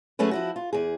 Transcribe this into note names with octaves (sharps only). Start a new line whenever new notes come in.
F#3 A3 C#4 G#4 B4
F3 E4 F#4
F4
E2 G#4